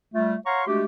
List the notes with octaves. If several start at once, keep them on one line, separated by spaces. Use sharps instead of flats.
G3 A3 F4
C#5 F5 F#5 A#5 C6 C#6
G#3 A3 D4 F#4 G4